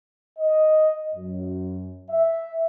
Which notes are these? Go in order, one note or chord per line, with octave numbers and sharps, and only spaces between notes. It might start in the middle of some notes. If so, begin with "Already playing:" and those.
D#5
F#2
E5